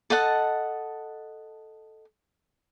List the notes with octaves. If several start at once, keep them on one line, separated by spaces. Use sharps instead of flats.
A4 D#5 F#5 A5